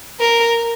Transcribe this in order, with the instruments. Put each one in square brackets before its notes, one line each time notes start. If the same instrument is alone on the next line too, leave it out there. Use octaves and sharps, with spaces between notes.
[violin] A#4